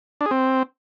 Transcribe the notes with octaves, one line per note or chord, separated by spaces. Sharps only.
D4
G#4
C4